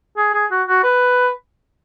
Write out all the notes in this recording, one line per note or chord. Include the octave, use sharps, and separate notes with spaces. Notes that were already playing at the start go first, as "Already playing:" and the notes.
G#4
G#4
F#4
F#4
B4